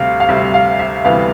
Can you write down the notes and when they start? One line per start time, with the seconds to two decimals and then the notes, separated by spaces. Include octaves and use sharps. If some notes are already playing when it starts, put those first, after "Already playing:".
Already playing: D2 C3 G3 F5
0.20 F5
0.29 D2 C3 G3 E5
0.54 F5
0.79 E5
1.04 D2 C3 E3 G3 B3 F5